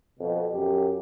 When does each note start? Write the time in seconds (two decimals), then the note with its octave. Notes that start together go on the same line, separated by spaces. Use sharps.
0.20 F2 B2
0.54 F#2 G4